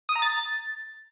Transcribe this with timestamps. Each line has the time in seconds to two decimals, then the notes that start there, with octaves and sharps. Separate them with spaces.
0.09 D#6
0.16 A#5
0.22 A6